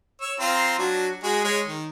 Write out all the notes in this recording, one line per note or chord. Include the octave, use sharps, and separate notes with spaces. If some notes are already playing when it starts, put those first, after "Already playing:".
C#5 E6
C4 F4 A#5
F#3 D4 F#4
G#3 F#4 G#4
G#3 C#5
D#3